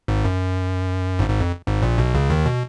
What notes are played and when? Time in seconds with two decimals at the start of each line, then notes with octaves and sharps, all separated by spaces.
0.08 G#1 G#2
0.25 F#2
1.19 G#1 G#2
1.30 G#1 G#2
1.41 F2
1.67 G#1 G#2
1.82 A#1 A#2
1.98 B1 B2
2.14 C#2 C#3
2.30 D#2 D#3
2.46 B2